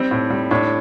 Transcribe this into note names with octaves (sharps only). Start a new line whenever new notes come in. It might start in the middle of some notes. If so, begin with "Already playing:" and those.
Already playing: G3 C4
A2
G3
A2 D4